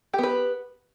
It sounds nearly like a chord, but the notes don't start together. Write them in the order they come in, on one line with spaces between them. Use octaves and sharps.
G4 B3 B4